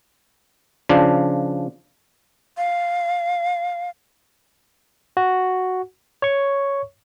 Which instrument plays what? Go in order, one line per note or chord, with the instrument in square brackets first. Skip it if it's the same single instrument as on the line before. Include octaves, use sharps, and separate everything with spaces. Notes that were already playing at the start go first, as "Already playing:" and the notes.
[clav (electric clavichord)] C#3 F3 D4
[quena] F5
[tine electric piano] F#4
C#5 C#6